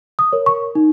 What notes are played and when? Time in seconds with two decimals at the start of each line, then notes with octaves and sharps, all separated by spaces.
0.19 D#6
0.33 A#4 C#5
0.46 C#6
0.75 D#4